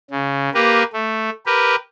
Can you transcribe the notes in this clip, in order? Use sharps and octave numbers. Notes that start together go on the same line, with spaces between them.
C#3
A#3 G4 A#4 B4
A3
G4 A#4 B4